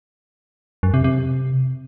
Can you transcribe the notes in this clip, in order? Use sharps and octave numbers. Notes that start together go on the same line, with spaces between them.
F#2
C3
C3